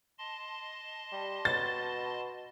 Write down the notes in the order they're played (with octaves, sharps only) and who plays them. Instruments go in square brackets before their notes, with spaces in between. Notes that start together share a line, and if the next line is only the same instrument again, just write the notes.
[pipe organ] D#5 A5 C6
[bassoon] G3
[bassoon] B2 [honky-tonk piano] A6